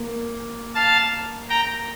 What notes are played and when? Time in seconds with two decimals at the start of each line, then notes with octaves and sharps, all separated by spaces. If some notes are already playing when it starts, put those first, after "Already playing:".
Already playing: A#3
0.75 F5 A5
1.50 G5 A#5